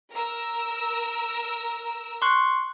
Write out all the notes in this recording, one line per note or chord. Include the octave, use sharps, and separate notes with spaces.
A#4 E6
C6 C#6 F#6